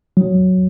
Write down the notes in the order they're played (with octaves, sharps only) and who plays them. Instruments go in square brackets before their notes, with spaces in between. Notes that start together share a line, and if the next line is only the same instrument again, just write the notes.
[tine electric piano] F#3